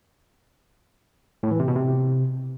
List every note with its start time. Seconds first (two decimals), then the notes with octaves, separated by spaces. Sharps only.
1.43 A2
1.51 E3
1.60 C3
1.68 B2
1.76 C3